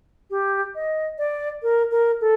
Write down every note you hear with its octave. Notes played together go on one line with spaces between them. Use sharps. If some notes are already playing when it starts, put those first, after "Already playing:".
G4
D#5
D5
A#4
A#4
A4